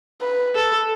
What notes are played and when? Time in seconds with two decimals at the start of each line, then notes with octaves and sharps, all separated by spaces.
0.21 B4
0.55 A4